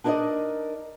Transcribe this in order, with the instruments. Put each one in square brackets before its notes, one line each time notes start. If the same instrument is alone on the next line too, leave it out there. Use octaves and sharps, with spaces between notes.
[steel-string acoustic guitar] D4 D#4 A#4 C5 D5 D#5